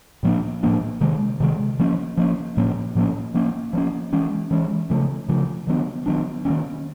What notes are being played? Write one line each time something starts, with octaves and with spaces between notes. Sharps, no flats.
A2 F3 A#3 D4
A2 F3 A#3 D4
C3 D#3 G#3
C3 D#3 G#3
F3 A#3 C#4
F3 A#3 C#4
A2 F3 A#3 C#4
A2 F3 A#3 C#4
F3 A#3 C#4
F3 A#3 C#4
E3 G#3 C#4
E3 G#3 C#4
C#3 F3 A3
C#3 F3 A3
D#3 F#3 B3 D4
D#3 F#3 B3 D4
D#3 F#3 A#3 C#4